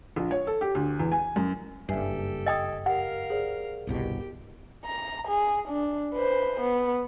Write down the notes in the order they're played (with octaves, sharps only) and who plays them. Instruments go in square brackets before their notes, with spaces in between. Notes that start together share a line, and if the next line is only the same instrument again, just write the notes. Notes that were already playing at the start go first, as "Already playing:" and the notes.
[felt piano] A#1
C#5
A4
G4
D2
E2
G#5
F#2
[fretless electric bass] F#1 G2 [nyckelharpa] G4 A4 [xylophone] E5 G#5 C7
[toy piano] D#5 G5 D#6 [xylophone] E6 G#6
[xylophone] G4 [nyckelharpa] A#4 F5 [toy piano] F#5
[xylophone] G#4 C5 D5
[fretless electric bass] G1 C2 B2 [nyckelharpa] G4
[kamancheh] A#5
G#4
D4
B4 C5
B3